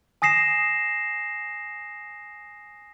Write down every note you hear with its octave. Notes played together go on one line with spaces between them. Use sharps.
G#5 D#6 A#6 C7 E7